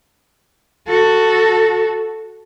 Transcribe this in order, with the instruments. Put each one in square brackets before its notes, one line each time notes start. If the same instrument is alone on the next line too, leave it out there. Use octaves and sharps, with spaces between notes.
[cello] F#4 A4